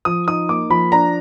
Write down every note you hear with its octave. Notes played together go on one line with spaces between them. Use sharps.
F3 D#6
D#4 D#6
A#3 D6
F3 B5
D4 A#5